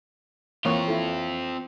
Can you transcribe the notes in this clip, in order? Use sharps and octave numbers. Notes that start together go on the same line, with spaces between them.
E3 A#3 C4 F4 C#5
E4 A4